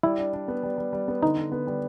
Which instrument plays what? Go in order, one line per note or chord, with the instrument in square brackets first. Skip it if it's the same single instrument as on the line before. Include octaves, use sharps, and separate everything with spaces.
[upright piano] G3 [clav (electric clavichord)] E4
[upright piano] D4
D4
B3
G3
G3
G3
B3
[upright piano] D3 [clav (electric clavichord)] D#4
[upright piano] D3
B3
G3